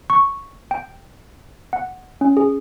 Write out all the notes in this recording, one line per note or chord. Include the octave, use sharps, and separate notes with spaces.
C#6
G5
F#5
C#4
G#4